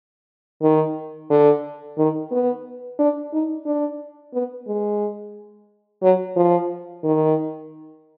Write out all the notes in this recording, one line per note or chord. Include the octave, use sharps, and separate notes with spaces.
D#3
D3
D#3
B3
D4
D#4
D4
B3
G#3
F#3
F3
D#3